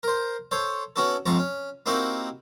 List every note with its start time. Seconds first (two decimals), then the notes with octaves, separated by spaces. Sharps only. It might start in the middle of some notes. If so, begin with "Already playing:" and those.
0.03 A#4 C5
0.51 A4 C5 C#5
0.96 B3 C#4 E4 F#4 A4
1.26 F2 G#2 F3 A5 A#5 C#6
1.39 C#4
1.86 A#3 C4 D#4 E4 F#4 G4